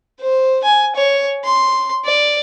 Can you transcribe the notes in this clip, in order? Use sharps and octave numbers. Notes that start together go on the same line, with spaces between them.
C5
G#5
C#5
C6
D5